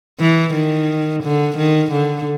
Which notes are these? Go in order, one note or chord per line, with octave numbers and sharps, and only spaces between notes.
E3
D#3
D3
D#3
D3